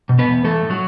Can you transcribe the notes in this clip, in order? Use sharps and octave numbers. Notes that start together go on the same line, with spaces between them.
B2
B3 B4
E2
E3 A3 A4
A2
F#3 F#4